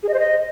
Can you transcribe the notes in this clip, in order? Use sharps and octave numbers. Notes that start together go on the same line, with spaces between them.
G#4
D#5
C5
D#5